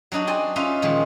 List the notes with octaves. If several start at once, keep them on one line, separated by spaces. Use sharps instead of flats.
F#3 D4 D#4 F#4 A5
C4 D5 G#5
C#4 D#4 F4 B4 E5 F5
A#2 D#3 F3 G#3